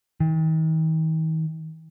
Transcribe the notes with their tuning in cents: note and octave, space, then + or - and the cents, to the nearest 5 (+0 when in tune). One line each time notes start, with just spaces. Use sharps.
D#3 +40